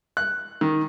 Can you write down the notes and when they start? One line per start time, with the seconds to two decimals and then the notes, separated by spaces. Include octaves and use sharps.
0.17 F#6
0.61 D#3